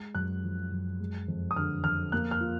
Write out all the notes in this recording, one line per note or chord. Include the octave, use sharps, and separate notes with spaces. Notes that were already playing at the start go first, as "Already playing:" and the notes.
Already playing: G#3
F#2 F#6
F3
F#2
G#3
F2
D#6
D3 F6
F2 F6
A#3 F#6
F6
F4